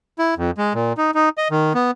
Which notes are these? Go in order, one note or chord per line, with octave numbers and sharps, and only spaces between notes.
E4
F2
G#3
A#2
D#4
D#4
D#5
D#3
B3